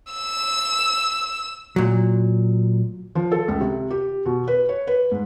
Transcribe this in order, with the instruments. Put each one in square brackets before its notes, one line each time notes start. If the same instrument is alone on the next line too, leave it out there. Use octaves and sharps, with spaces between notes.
[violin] E6 E7
[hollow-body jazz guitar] A#2 F#3
[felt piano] F3
A4
C#2
C3
G4
B2
B4
C#5
B4
G#2